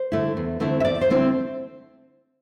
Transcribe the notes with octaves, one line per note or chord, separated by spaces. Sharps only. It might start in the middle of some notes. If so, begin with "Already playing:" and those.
Already playing: C5
D3 A3 E4
E2
D3 A3 C4 E4
E5
E2 D5
C5
D3 A3 C4 E4